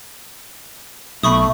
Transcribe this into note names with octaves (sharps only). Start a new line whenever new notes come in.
B1 A3 B5 C#6 D#6